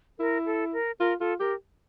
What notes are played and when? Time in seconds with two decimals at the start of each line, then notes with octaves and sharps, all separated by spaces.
0.19 E4 A#4
0.46 A4
0.73 A#4
1.00 F4 A#4
1.20 F4 A4
1.39 G4 A#4